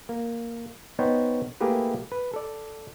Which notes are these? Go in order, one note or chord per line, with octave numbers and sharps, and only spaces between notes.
A#3
B3 D#4 C5 C#5 G5
A3 A#3 E4 G4 G#4 B4
B4
A4 D5